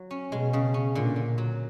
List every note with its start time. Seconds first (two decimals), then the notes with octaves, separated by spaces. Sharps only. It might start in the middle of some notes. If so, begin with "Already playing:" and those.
Already playing: F#3
0.11 C#4
0.31 B2 G#3
0.53 C#3
0.74 C#4
0.95 A#2 D3
1.16 D3
1.38 F#3